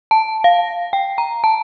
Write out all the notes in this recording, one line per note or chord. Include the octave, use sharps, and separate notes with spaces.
A5
F5
G5
A#5
A5